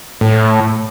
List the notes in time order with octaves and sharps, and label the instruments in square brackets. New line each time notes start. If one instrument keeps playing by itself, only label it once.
[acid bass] A2